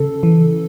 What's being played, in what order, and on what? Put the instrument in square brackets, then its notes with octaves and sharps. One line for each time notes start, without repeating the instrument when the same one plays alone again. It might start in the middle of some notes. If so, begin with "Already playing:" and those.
Already playing: [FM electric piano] C#3 A4
E3